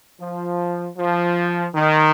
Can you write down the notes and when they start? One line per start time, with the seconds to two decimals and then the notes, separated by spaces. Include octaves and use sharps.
0.21 F3
0.98 F3
1.75 D#3